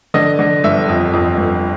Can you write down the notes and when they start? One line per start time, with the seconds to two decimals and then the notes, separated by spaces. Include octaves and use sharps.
0.14 D3 D#5
0.39 D3
0.63 G1 E5
0.88 F2
1.13 F2
1.38 G1